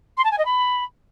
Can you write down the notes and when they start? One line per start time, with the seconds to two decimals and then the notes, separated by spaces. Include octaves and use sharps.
0.17 C6
0.24 A5
0.31 G#5
0.38 D#5
0.45 B5